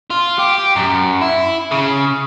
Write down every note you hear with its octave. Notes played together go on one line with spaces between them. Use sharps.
F4
G4
F#2
E4
C#3